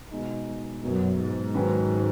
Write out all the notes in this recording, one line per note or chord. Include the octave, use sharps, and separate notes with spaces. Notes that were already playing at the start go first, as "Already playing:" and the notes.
B2 G#3 D#4
F#2 B2 F#3 B3
G#2
D#3 F#3 C#4 F#4 B4